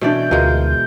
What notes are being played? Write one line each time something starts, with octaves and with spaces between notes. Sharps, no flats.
B2 E3 A3 D4 D5 G6
D2 B2 G#3 F4 A#4